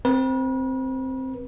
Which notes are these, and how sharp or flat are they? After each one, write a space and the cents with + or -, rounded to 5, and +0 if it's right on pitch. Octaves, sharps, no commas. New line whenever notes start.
C4 +0 B4 -40